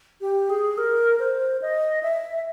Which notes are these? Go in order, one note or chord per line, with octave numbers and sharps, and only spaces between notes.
G4
G#4
A#4
C5
D#5
E5